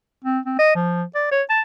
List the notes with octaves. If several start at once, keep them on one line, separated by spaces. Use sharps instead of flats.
C4
C4
D#5
F3
D5
C#5
A5